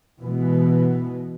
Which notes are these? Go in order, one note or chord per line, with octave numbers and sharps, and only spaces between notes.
B2 E3 G#3 B3